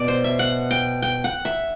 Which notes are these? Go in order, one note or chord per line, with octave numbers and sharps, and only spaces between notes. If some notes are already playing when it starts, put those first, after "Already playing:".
Already playing: B2 D5
C5
E5
F#5
G5
G5
F#5
E5